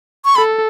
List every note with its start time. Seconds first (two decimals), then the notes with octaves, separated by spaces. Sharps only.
0.25 C#6
0.36 A4 B5